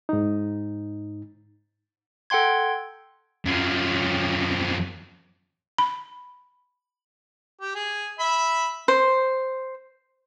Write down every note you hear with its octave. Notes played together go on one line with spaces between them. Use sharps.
G#2 D#4
A4 F#5 G5 C6 G#6
F#2 F3
B5
G4
G#4
E5 B5
C5